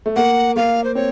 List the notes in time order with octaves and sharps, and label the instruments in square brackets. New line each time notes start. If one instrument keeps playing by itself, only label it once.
[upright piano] A3
[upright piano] A#3 [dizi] F#5
[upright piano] A#3 [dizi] F5
[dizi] C5
[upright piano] C4 [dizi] C#5